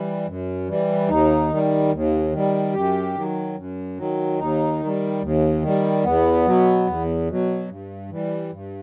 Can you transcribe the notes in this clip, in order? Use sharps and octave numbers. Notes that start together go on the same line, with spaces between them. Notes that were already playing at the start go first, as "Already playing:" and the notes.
Already playing: E3 G3
F#2
E3 G3
D#2 D#4
D#3 G3
D#2
D#3 G3
F#2 G4
D#3 F#3
F#2
D#3 F#3
D#2 D#4
D#3
G3
D#2
D#3 G3
E2 B3
B2 F#3
E2
B2 F#3
G2
E3 G3
G2